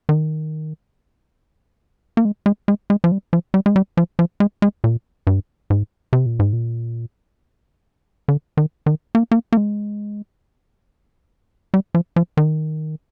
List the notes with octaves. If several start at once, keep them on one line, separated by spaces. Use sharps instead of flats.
D#3
A#3
G#3
G#3
G#3
G#3
F3
G3
F3
G3
G#3
G3
F3
F3
G#3
G#3
A#2
G2
G#2
C3
A#2
G#2
A#2
D3
D#3
D#3
A#3
A#3
A#3
G#3
G3
F3
F3
D#3